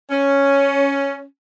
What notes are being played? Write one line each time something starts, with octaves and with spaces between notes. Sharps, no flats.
C#4